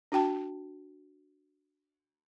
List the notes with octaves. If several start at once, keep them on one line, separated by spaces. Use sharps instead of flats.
D4 F#4 G5 A5